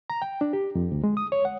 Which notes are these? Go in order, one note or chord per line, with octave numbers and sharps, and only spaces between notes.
A#5
G5
D4
G4
F2
D2
G#3
D#6
C#5
F#5